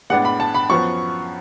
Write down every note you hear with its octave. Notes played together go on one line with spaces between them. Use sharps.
A2 G#3 B3 D4 F#5
B5
A5
B5
F#2 F3 B3 C#6